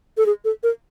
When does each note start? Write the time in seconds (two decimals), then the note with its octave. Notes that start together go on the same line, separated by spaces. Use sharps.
0.18 A4
0.26 G#4
0.45 A4
0.63 A#4